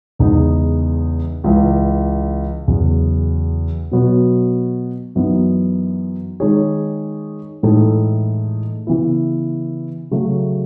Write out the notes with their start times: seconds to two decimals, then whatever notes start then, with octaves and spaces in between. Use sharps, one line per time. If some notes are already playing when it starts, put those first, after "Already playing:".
0.19 E2 C#3 G#3 B3 D#4
1.44 C#2 C#3 E3
2.68 E2 C#3 F#3
3.91 B2 F#3 B3 F#4
5.16 F#2 E3 B3 D#4
6.40 D#3 G#3 D#4 G#4 C#5
7.63 A2 E3 G#3 D#4 A4
8.87 C#3 E3 B3 E4
10.11 C#3 F#3 A3